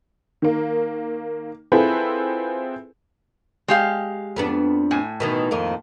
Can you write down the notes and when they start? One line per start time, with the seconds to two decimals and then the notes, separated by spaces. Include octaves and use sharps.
0.42 D#3 A#3
1.72 C4 E4 F4 G#4 A4 B4
3.68 G#3 G4 F5
4.36 F2 B3 D4
4.91 A2 G#5
5.20 B2 D#3 E3
5.51 F2 D#3 A#3